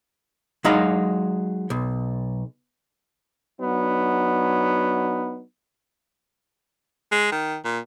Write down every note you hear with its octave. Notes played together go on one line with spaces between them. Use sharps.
F#3 G#3 D#4 F5 B5
B1
F#3 B3 D4 D#4
G#3
D#3
A#2